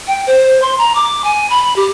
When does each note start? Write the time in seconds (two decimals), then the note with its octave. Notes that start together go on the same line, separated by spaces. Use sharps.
0.07 G5
0.27 C5
0.62 C6
0.78 A#5
0.95 D6
1.24 G#5
1.50 B5
1.76 G4